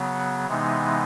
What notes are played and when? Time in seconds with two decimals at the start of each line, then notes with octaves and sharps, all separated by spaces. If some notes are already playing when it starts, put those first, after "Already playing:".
Already playing: C#3 F#3 B3
0.47 C3 E3 G#3 B3 D#4